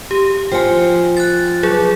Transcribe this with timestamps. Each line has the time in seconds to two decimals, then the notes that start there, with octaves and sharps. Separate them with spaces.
0.11 G4
0.52 F3 G5 G#5
1.17 F#6 A6
1.63 F#3 G#4